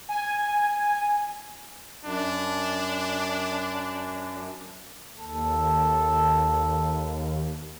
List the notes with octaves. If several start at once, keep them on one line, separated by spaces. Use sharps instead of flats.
G#5
F#2 D4
D#2 A4